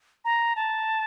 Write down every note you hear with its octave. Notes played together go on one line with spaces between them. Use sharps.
A#5
A5